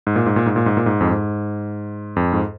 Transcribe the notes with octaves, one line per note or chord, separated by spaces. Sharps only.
G#2
A#2
G#2
A#2
G#2
A#2
G#2
A#2
G#2
F2
G#2
F2
G#2